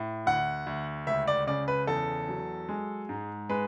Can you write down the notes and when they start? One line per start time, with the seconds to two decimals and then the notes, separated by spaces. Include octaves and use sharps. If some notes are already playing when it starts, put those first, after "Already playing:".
Already playing: A2
0.26 D2 F#5
0.67 D2
1.07 C#2 E5
1.27 D5
1.47 C#3 D5
1.68 B4
1.87 E2 A4
2.29 F#3
2.69 G#3
3.09 G#2
3.49 G#3 B4